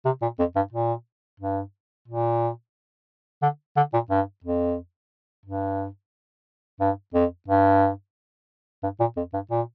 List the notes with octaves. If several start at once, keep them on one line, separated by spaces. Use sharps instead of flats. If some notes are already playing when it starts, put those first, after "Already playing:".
C3
A#2
F2
G2
A#2
G2
A#2
D3
D3
A#2
G2
F2
G2
G2
F2
G2
G2
A#2
F2
G2
A#2